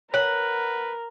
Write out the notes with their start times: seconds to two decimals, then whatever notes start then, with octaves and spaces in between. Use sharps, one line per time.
0.14 A#4 B4 C#5 F#5